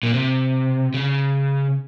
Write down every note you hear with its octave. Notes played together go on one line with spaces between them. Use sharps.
A#2
C3
C#3